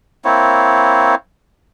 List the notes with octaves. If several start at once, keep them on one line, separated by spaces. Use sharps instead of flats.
A#3 C4 E4 C#5